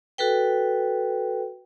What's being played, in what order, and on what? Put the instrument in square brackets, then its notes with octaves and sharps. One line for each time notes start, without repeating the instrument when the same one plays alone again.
[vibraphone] F#4 A4 B4 G5